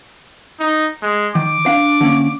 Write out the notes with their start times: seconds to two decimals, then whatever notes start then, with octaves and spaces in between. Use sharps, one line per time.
0.59 D#4
1.02 G#3
1.35 D#3 D6
1.66 D4 F5
2.01 D3 A#3 C#4